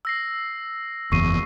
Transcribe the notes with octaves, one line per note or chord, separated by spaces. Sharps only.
E6 A#6 C7
F#1 E2 C#6 C7 D#7